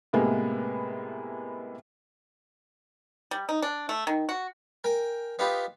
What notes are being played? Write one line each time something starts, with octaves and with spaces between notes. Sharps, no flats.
A2 C3 G#3 A#3 B3
G3
D#4
D4
A3
D#3
F#4
A#4 G5 G#5
B3 D#4 F4 G4 B4